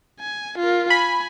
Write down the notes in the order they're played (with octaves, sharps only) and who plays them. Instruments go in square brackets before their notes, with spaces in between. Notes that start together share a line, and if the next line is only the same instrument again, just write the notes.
[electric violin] G#5
F4 A#4
[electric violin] G#5 [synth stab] B5